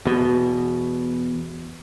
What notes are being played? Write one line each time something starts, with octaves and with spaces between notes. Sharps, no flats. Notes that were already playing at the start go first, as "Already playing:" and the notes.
E2 B2